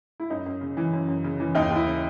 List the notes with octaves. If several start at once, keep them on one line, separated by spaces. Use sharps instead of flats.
E4
F#2 D#4
F#2
C#3
E3
F#2
F#2
C#3
E3
D#2 D#4
D#2
E4
C#3